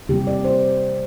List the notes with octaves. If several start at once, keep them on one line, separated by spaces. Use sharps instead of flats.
C3 G3 A#3 G4
D5
C5